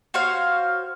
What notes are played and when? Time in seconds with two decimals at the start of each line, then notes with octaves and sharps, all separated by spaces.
0.14 F#4 C5 C#5 F5